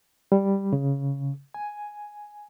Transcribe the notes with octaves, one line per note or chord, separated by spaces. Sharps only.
G3
C#3
G#5